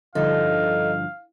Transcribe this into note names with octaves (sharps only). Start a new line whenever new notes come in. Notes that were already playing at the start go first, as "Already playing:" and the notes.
G2 D3 F3 D#4 A4 F5